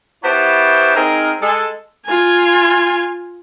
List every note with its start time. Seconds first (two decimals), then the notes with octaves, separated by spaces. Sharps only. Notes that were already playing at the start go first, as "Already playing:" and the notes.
0.24 B3 E4 G4 C5 C#5 A5
0.96 C4 D#4 G#4 A#4
1.42 G#3 A4
2.06 F4 G#5